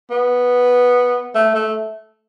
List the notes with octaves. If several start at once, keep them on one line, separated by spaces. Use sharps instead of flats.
B3
A3
A3